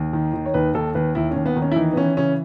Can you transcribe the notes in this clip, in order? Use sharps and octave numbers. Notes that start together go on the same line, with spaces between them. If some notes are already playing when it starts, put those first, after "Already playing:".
Already playing: D#2
D#3
D#3
C#5
D#2 B4
D#2 A4
D#2 B4
D#2 E4
D#2 C#4
B3
D#3
C#4
E4
E3 D#4
B3
E3 C#4
C#3 C#4